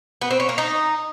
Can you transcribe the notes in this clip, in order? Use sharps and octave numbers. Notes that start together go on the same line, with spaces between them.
B3
C4
C#4
A#3
D#4